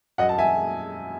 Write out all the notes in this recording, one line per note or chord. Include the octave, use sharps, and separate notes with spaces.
F#2 D#5 F#5
A5
E5 G#5